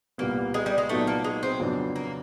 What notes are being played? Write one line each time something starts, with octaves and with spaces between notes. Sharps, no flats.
C2 A#2 G3 A#3 B3
G#3
G3
G#3
A#2 F#3 A3 B3 D#4
A#3
G#3
C4
F2 C#3 F#3 B3 D4
A#3